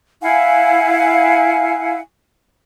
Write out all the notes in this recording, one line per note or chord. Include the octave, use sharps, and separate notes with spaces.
E4 F5 F#5 G#5